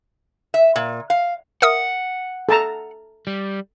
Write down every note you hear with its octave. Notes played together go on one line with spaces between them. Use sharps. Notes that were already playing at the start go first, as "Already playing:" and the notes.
E5
A#2
F5
A#4 E5 F#5 D#6
A4 A5 A#5
G3